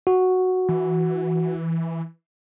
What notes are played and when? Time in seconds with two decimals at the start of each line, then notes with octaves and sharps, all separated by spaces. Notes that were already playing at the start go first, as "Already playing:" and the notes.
0.07 F#4
0.69 E3